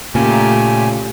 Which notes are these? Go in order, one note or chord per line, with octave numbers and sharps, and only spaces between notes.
A#2 C#3 A3 G4 G#5